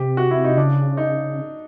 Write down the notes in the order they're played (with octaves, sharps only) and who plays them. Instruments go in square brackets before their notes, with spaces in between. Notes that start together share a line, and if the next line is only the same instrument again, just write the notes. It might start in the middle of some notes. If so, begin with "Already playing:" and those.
Already playing: [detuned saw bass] C3 [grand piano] G4
[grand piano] F#4
E4
D#4
[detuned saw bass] C#3 [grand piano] D4
[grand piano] D#4